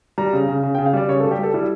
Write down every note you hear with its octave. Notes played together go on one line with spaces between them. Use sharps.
G3 A#5
C#3
C#3
C#3
G5
C#3
F5
G3 D5
C#3 C#5
A4
G3
G4
G3 A4
G3 E4